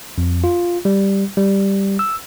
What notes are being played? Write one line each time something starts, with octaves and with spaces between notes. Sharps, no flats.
F2
F4
G3
G3
E6